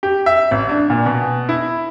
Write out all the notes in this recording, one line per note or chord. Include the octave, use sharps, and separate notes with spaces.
G4
E5
A1
D4
A#2
B2
E4